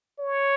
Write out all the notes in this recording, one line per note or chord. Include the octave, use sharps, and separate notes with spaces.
C#5